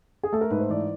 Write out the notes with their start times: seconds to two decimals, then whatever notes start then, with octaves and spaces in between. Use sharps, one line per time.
0.23 G#4
0.33 A3 A4
0.41 A#4
0.51 G#2 B4
0.60 C5
0.70 E3 D5